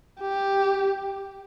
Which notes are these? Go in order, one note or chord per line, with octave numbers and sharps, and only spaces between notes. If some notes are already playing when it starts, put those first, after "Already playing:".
G4